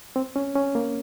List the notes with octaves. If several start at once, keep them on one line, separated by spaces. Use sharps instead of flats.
C4
C#4
C#4
A#3